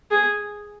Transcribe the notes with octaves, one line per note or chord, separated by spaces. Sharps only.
G#4